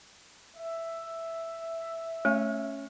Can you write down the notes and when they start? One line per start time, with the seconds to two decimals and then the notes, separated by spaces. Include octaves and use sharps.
0.56 E5
2.25 A3 C#4